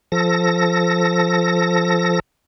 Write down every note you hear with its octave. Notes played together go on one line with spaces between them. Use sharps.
F3 A4 A#6